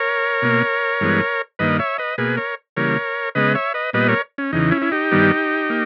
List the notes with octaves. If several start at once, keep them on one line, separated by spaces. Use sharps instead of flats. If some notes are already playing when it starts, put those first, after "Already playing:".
Already playing: A#4 C#5
B2 A#3
G2 E3 G#3 B3
G2 D#3 A#3 B4 D#5
C#5 E5
B4 D#5
B2 A#3 G#4 B4
A#4 C#5
C#3 E3 G3 A#3 A#4 C#5
C#3 G#3 B3 B4 D#5
C#5 E5
B4 D#5
A#2 G3 B3 B4 D#5
A#4 C#5
C#4
E2 C#3 E3 D#4
C#4 E4
E4
D#4 G4
G2 D#3 G3 B3
A#3